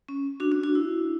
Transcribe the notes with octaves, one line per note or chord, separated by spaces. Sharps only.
C#4
D4 F#4
D4 F#4
D4 F#4
E4